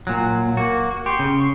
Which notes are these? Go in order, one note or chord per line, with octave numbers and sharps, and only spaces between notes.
A#2 F#3
A#3 F#4
G4 C6 C#6
C#3